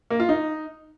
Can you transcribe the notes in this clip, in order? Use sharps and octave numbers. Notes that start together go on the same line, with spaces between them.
A#3
F4
D#4